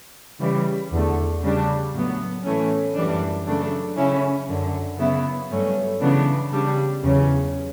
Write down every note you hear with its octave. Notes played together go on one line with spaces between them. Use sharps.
C#3 E3 G3
E2 D3 A3
C#3 G3 D4
A2 F#3 B3
A2 E3 A3 C#4
F#2 E3 G3 D4
C#3 F#3 A3 D4
C#3 F#3 C#4 E4
F#2 D3 F#3
C#3 F#3 B3 E4
G2 F#3 A3 C#4
C#3 E3 B3 D4
C#3 G3 D4
E2 C#3 F#3 C#4